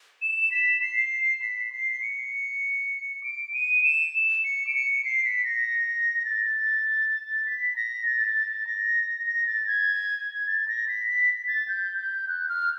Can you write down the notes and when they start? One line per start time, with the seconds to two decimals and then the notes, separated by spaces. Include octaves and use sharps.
0.22 E7
0.52 B6
0.82 C7
1.42 B6
1.72 C7
2.02 C#7
3.23 D7
3.53 D#7
3.84 E7
4.44 C#7
4.67 D7
4.75 C#7
5.05 C7
5.25 B6
5.44 A#6
6.19 A#6
6.25 A6
7.46 B6
7.76 A#6
8.06 A6
8.67 A#6
9.27 A#6
9.47 A6
9.67 G#6
10.47 A6
10.68 A#6
10.88 B6
11.08 B6
11.48 A6
11.68 G6
11.99 G6
12.28 F#6
12.49 F6